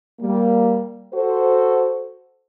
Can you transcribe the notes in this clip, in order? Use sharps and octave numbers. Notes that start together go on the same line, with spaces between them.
G3 A#3
F#4 A4 C5